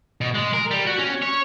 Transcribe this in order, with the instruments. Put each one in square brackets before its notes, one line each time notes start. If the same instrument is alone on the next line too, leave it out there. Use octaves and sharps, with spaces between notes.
[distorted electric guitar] B2
G#3
A#4
G3
F#4
C#4
C#5